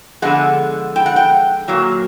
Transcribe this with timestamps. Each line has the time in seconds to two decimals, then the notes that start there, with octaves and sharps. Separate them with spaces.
0.22 D3 F3 G#3 B3 F#5
0.96 G5
1.06 F#5
1.16 G5
1.68 A#2 F#3 A#3